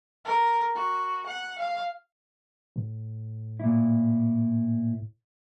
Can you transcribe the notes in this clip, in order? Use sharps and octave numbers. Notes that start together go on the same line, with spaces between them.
A#4
F#4
F#5
F5
A2
A#2 E4